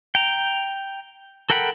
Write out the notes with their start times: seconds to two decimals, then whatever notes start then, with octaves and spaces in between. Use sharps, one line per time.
0.15 G5 A#5
1.50 A4 A#4 F#5 G5 B5